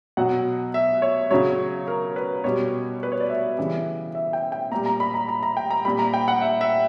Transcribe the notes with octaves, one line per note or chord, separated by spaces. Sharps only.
B2 F#3 F#5
E5
C#5
C#3 F#3 C#5
A#4
B4
B2 G3 C#5
B4
C#5
D5
E5
C#3 E3 G3
E5
G5
G5
A#2 G3 A#5
A#5
B5
A#5
A#5
A#5
G5
A#5
A#2 G3 B5
A#5
G5
F#5
E5
E5